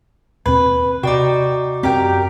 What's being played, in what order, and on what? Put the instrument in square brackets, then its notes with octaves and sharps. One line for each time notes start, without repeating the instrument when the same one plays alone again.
[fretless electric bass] D#2 B2 C4 [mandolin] B4
[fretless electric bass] C3 [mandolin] D#4 G5 [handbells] F#4 D5 D6
[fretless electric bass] F#2 C4 [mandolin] G4 A#4 G5